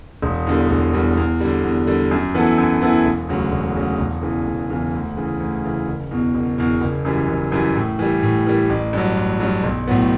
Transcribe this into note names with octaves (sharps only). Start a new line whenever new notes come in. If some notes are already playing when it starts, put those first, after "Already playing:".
E1
E2 D3 G3
E1
E2 D3 G3
E2
D3 G3
E2
D3 G3
F#2
E3 B3 E4 A4
F#2
E3 B3 E4 A4
E1
D2 C#3 F#3
E1
D2 C#3 F#3
E1
E2 C#3 E3
E1
E2 C#3 E3
D2
C#3 E3
D2
C#3 E3
F#1
E2 B2
F#1
E2 B2
F#1
F#2 E3 G3
F#1
F#2 E3 G3
A2
E3 G3
A2
E3 G3
A1
G2 F#3
A1
G2 F#3
B1
A2 F#3 B3